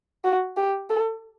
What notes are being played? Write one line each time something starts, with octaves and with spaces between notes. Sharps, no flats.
F#4
G4
A4